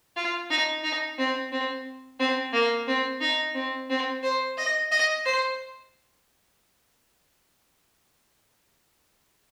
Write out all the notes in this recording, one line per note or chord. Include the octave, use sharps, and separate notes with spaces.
F4
D#4
D#4
C4
C4
C4
A#3
C4
D#4
C4
C4
C5
D#5
D#5
C5